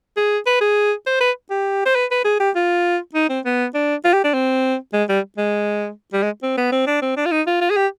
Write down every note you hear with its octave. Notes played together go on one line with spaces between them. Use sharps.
G#4
B4
G#4
C5
B4
G4
C5
B4
B4
G#4
G4
F4
D#4
C4
B3
D4
F4
G4
D4
C4
G#3
G3
G#3
G3
G#3
C4
B3
C4
D4
C4
D4
F4
D#4
F4
F4
G#4
G4